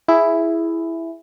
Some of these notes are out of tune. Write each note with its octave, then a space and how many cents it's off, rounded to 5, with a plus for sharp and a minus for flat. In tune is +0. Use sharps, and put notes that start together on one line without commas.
E4 +5 G#4 +0